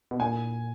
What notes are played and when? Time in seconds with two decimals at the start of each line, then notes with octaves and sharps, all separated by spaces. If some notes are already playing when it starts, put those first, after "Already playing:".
0.11 B2
0.20 A#2 G#5